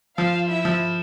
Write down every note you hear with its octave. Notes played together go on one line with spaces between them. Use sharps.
F3 F4 F5
E4 E5
F3